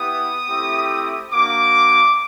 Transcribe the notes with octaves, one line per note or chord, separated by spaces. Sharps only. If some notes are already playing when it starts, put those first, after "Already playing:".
Already playing: B3 E4 G4 D#6
A3 C4 E4 G4
A#3 D4 F#4 D6